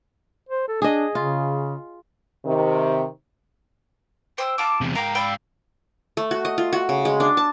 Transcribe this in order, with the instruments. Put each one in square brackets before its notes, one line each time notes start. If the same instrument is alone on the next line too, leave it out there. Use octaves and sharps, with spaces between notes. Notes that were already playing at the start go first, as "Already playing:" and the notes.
[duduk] C5
A4
[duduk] D4 [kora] G#4 D#5
[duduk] C#3 [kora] F4
[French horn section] C3 D#3
[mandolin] C5 E6 [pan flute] G5
[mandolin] F4 D6 [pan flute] A5
[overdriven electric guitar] E2 C3
[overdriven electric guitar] G#2 F5 [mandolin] A#4 G5 [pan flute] A#5
[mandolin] D5 G5 E6 [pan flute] B5
[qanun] A3
F#4
D#5
F4
F#4
C#3
G#3
D4
A5